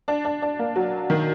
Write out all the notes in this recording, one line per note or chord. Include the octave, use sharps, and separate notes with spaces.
D4
D4
D4
A#3
F#3
D#3